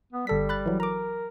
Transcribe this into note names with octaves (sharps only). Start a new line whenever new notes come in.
B3
G1 G3 A4 B6
B5 F#6 A6
E3 F#3
A#4 A#5 D6